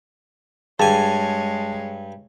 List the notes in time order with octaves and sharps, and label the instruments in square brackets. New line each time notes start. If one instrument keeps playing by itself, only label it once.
[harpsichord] G2 G#5 [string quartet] G#3 C#5 [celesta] G#4 [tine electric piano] A5